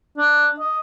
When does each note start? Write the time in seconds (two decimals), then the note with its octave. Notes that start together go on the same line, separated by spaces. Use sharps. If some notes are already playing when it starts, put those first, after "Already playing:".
0.17 D4
0.60 D#5